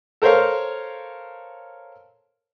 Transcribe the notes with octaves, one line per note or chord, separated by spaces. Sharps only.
A4 A#4 C5 C#5 F5